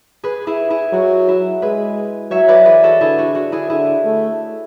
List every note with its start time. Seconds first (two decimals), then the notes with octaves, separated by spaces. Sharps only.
0.24 G#4 B4
0.47 E4 G#4
0.70 E4 G#4
0.93 F#3 F#4
1.28 E4
1.62 G#3 G#4 B4
2.31 F#3 C#5 E5
2.48 B4 D5
2.65 E3 G#4 B4
2.83 F#4 A4
3.00 D3 E4 G#4
3.18 F#4
3.35 F#4
3.52 E4 G#4
3.70 D3 E4 G#4
4.05 A3